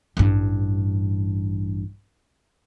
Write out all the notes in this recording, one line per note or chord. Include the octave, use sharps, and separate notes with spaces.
A1 G2